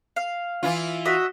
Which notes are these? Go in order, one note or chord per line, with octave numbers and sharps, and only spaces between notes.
F5
E3 E4 F4
F#4 D#5 E5